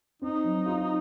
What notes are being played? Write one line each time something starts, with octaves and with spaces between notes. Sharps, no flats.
C4 D#4
F#3
F4